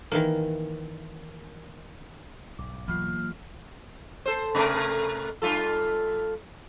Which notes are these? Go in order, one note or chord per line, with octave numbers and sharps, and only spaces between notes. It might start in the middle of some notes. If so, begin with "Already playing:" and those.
D#3 E3 A#3
B1 G#2 D6
E3 F#3 A#3 F4 F6
A4 C5
C3 A3 A#4
G2 F4 A4